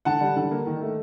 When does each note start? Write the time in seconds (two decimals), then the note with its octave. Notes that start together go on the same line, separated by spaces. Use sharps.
0.05 D3 F#5 A5
0.20 G3
0.36 D3
0.51 A#3
0.66 D#3
0.81 A3